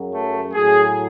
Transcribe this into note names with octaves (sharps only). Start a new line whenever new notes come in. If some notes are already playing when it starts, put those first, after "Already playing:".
Already playing: F#2 C#3 F#3
A3
A2 F#3 G#4